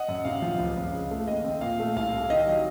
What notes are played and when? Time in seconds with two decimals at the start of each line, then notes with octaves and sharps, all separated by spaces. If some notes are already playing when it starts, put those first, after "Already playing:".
Already playing: D#5 F#5
0.08 F#2
0.25 C3 F5
0.42 F3
0.59 C#2
0.77 C#2
0.93 C#3
1.11 A3
1.27 D#2 D#5
1.44 C4
1.61 A#2 F5
1.80 A3
1.96 C2 F5
2.13 C2
2.30 D#3 D#5
2.47 F#3